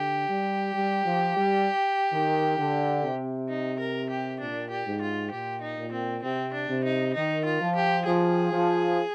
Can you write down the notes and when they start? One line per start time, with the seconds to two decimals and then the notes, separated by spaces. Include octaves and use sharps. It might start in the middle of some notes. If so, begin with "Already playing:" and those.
Already playing: D3 G4
0.29 G3
0.74 G3
1.05 F3
1.36 G3
2.12 D#3
2.58 D3
3.04 C3
3.49 D#4
3.80 A#4
4.10 G4
4.41 A#2 D4
4.71 G4
4.86 G#2
5.02 F4
5.31 A#2 G4
5.62 D#4
5.78 A#2
5.93 C4
6.23 C3 C4
6.54 D4
6.69 C3
6.85 D#4
7.14 D#3 D#4
7.46 F4
7.61 F3
7.76 G4
8.06 F3 G#4
8.52 F3